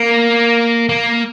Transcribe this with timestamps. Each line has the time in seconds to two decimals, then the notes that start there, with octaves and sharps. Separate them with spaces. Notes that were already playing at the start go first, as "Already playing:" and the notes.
Already playing: A#3
0.89 A#3